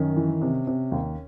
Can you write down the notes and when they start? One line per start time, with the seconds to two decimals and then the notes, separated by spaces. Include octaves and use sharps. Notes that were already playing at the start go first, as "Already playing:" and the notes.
Already playing: F#2 D#3 C#4
0.16 E3
0.42 C3
0.67 C3
0.92 D#2